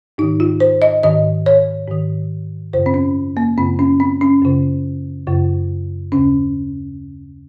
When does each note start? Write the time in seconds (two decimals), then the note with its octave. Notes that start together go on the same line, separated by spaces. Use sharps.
0.18 G#2 D#3 D#4
0.40 F4
0.60 C5
0.82 D#5
1.03 G#2 D#3 D#5
1.46 C#5
1.88 G#2 D#3
2.73 F#2 C#3 C5
2.86 C4
2.94 C#4
3.37 A#3
3.58 F#2 C#3 C4
3.79 C#4
4.00 C4
4.21 C#4
4.42 F#2 C#3
5.27 F#2 C#3
6.12 D#2 C#3 C#4